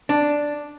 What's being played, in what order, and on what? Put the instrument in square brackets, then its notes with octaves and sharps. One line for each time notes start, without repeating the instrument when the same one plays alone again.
[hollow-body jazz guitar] D4